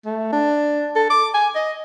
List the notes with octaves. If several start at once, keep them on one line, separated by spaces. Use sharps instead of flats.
A3
D4
A4
D6
G#5
D#5